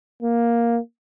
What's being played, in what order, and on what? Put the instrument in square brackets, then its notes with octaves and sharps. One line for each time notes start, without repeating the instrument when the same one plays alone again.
[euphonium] A#3